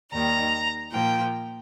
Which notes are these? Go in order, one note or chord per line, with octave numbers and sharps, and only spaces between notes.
D#2 D#3 G3 A#5
A#2 F3 A#3 G5